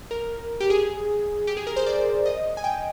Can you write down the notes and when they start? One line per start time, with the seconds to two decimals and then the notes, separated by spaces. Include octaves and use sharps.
0.11 A#4
0.60 G4
0.70 G#4
1.47 G4
1.57 G#4
1.67 A#4
1.76 C5
1.86 D5
2.26 D#5
2.57 G#5
2.64 G5